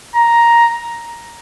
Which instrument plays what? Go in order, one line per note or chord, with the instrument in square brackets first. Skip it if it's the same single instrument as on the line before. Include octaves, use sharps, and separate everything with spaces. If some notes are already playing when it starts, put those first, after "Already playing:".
[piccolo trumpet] A#5